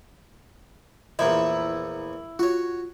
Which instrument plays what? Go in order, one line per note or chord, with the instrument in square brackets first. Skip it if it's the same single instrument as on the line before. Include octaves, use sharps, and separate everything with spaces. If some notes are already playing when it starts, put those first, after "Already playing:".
[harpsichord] E2 A#2 F3 [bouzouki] E4
[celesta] F4 [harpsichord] F#4 C#5